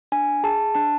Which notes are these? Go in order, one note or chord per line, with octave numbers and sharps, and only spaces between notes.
D4 G#5
G#4 A5
D4 A5